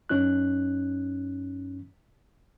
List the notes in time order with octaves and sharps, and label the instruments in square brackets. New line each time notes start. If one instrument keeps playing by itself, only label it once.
[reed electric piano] F#2 C#4 D#4 F#6